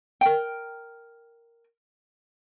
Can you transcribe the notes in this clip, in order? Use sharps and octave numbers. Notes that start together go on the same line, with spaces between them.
A#4 G5